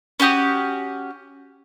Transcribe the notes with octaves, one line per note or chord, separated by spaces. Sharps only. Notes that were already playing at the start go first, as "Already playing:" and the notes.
C#4 F#4 G4 D#6